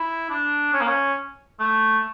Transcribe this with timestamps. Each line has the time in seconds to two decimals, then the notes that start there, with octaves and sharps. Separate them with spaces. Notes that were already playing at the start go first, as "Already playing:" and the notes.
Already playing: E4
0.30 D4
0.73 C#4
0.81 A#3
0.87 C#4
1.59 A3